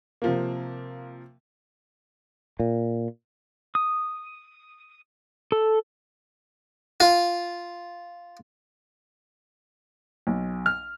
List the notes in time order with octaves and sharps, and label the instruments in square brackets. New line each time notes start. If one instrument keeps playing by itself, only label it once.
[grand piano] C3 F3 A#3
[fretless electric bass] A#2
[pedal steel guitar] D#6
A4
[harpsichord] F4
[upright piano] B1
F6